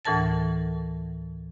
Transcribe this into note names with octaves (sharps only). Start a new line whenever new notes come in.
D2 A2 E3 A#4 A5 A6